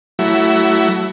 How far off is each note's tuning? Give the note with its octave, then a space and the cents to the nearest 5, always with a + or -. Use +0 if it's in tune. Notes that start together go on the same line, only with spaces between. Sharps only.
F#3 +25 A3 +0 E4 +0